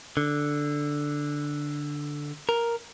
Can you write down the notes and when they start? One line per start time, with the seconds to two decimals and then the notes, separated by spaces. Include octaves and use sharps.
0.17 D3
2.49 A#4